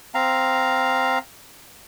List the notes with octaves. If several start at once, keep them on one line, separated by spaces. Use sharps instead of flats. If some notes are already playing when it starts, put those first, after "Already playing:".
C4 F5 A#5